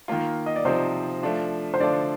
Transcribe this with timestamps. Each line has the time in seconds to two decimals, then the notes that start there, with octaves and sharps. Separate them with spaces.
0.08 D#3 A#3 F4
0.46 D#5
0.56 D5
0.65 C3 F3 C4 D#4 C5
1.23 F3 A3 D4 F4
1.74 C5
1.80 D3 F3 A3 D4 F4 D5